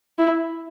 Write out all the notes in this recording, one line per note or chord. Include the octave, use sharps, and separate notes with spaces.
E4